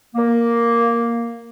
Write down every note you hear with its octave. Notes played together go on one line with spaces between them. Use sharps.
A#3